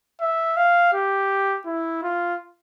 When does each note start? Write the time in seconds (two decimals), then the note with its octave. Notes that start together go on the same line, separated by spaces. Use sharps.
0.21 E5
0.57 F5
0.93 G4
1.66 E4
2.03 F4